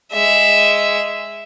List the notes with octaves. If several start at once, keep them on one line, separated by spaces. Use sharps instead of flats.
G#3 E5